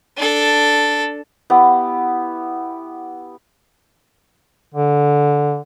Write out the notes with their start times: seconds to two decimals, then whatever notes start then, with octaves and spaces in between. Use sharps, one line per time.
0.17 D4 A4
1.50 B3 E4 G4
4.74 D3